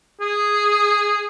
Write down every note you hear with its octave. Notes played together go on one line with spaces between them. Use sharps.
G#4